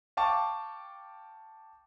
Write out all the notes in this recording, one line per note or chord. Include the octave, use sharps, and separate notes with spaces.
F5 G5 A5 C#6 D6